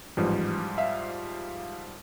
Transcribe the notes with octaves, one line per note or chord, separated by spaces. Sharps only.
A1 G#2 F3 G3
E5 F5